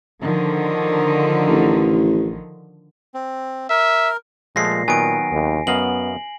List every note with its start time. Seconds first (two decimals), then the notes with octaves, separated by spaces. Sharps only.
0.20 D3 D#3 F3
1.48 A1
3.14 C4
3.70 A#4 E5
4.56 A#2 F3 G#3 A3 A#6 C7
4.88 D#3 F#3 B3 G#5 D7
5.31 D#2
5.67 F#2 B3 D#5 F5 F#7